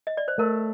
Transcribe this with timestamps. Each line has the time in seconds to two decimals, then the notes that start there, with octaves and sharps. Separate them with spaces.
0.07 D#5
0.17 D5
0.28 C5
0.38 A3 A#4